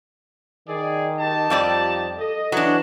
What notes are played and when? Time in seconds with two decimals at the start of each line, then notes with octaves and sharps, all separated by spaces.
0.68 D#3 G#4 D5
1.18 D#4 G4 A5
1.50 F2 F3 G3 D5
2.19 A4 D#5
2.52 E3 F#3 D4